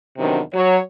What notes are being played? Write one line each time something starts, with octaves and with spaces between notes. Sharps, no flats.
E2 C3 D#3 F#3 B3 D4
F#3 C#5